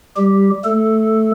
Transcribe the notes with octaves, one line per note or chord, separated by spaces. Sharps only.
G3 G4
A3 A4